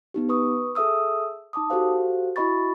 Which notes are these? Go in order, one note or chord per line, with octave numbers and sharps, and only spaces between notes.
B3 D#4 G4
B4 C#6 D#6
G#4 A4 E5 D#6 E6
D#4 A5 D6 D#6
F#4 G4 A4 C5 F5
E4 F#4 D#5 B5 C#6 A6